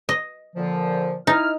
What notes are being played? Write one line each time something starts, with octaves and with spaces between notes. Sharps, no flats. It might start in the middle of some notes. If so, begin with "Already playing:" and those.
D#5
A#2 D3 F3
D#4 E4 F6